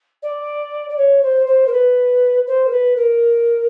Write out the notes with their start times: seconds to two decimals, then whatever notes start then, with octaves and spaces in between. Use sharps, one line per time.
0.22 D5
0.89 D5
0.97 C#5
1.22 C5
1.47 C5
1.67 A#4
1.72 B4
2.47 C5
2.67 A#4
2.71 B4
2.96 A#4